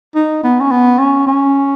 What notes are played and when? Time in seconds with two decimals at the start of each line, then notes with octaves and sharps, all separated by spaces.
0.15 D#4
0.44 B3
0.61 C#4
0.71 B3
0.99 C#4
1.27 C#4